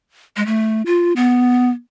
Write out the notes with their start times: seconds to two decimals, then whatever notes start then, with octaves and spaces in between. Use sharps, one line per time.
0.37 G#3
0.46 A3
0.86 F4
1.16 B3